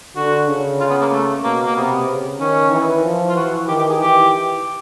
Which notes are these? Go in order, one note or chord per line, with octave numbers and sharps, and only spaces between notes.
D3 F#4
C#3
F4
B3
A#3
A3
B2 A#3
A#3
C3 B3
C#3
D#3 C#4
E3
F3
F4
E3 F#4
D#3 G4
G4
G#4
E3 G4